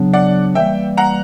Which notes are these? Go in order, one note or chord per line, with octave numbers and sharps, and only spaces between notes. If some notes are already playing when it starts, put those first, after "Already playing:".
Already playing: C#3 F#3 B3 D4
D5 F#5
E3 G3 A#3 E5 G5
F#5 A#5